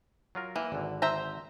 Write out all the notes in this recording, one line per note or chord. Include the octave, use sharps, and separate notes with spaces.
F#3 F4 A#4
E3 A#3
G#1 D3
C5 E5 A#5